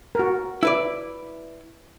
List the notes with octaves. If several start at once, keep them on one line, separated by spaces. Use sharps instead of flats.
F#4 A#4
E4 B4 D5